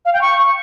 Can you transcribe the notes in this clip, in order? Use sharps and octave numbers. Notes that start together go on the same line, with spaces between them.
F5
G5
C#6